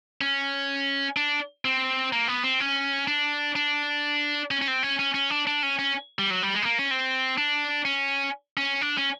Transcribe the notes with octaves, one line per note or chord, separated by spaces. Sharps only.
C#4
D4
C4
A#3
B3
C4
C#4
D4
D4
C#4
C#4
C4
C#4
C#4
C#4
D4
D4
C#4
C#4
G3
F#3
G3
G#3
B3
A#3
C#4
C4
D4
C#4
C#4
D4
C#4